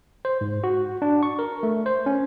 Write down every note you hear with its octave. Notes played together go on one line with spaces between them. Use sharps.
C5
G#2
F#4
D4
C#6
A#4
A3
C5
C#4